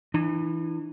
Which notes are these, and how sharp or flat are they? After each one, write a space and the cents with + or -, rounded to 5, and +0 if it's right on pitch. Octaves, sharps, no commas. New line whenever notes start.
E3 +0 D4 +45